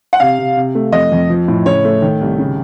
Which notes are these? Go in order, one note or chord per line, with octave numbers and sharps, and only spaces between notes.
F#5
C3 F5
C3
C3
A3
F2 D#5
F2
F3
A2
C#3 C#5
A3
D#3
C2
C#3